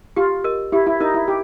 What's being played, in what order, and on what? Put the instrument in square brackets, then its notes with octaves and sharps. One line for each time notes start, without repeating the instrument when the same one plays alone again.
[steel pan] F4 [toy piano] G4
[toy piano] A#4 D#5
[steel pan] E4 [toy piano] G4
[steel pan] E4
[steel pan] D#4 [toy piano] A#4 D#5
[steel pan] E4
G4